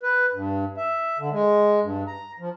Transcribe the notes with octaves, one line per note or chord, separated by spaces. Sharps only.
B4
G2
E5
D3
G#3
G2
A#5
F3